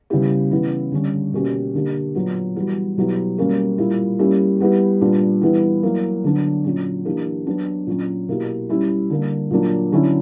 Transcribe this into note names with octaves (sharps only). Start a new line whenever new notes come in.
C#3 G3 B3 E4 G4
C#3 E3 B3 E4
D3 G3 C#4
B2 A#3 C#4 G4
D3 A#3 D4 G4
A#2 F#3 B3
E3 G3 B3 F#4
B2 F#3 B3 E4 G4
B2 G3 A#3 C#4 G4
A#2 G3 A#3 E4
G3 A#3 C#4 E4 G4
G3 B3 E4 G4
A#2 G3 B3 D4
E3 G3 B3 E4
F#3 A#3 E4
D3 F#3 B3 D4
A#2 F#3 C#4
E3 A#3 D4 G4
F#3 B3 D4
A#2 F#3 C#4
B2 A#3 E4 G4
G3 C#4 E4 G4
D3 G3 A#3
A#2 F#3 A#3 D4
D3 F#3 C#4 E4